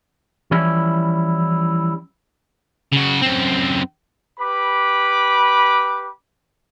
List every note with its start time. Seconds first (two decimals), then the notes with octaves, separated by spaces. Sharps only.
0.51 E3 F3 G3 C#4 E4
2.92 C#3 F#4
3.22 F#2 C4
4.39 G4 B4 B5 D6